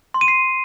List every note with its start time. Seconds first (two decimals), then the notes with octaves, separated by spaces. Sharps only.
0.14 C6
0.21 D#7
0.28 C7